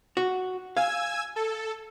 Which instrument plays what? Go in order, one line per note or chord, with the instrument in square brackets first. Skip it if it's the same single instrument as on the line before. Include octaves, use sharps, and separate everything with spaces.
[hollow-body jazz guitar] F#4
[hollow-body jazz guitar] F5 [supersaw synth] G#5 E6 G#6
[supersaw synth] A4